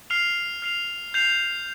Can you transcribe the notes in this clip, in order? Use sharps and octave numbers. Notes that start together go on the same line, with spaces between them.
F6 C7 F7
F6 C7 F7
G6 C7 F7